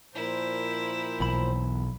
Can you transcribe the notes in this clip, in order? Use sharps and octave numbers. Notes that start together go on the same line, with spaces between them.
A#2 F3 E4 A#4 C5
B1 E2 B5